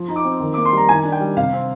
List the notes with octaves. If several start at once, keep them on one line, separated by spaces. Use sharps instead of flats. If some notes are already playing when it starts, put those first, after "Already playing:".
Already playing: F3
D#4
D6
C4
D#3
A#3 D6
C6
G3 A#5
D#3 G#5
D4
G5
G3
C3 F5
C4